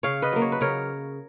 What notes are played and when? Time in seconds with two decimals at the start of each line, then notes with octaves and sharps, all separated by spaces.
0.03 C#3 C#5 F5
0.22 B4 D#5
0.32 F#3 A#3
0.42 C#5
0.52 B4
0.61 C#3 A#4 C#5